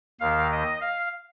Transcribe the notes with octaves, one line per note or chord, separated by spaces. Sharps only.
D#2 D#3 F5
D#5
F5